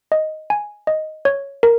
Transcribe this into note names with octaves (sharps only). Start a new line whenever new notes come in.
D#5
G#5
D#5
C#5
A#4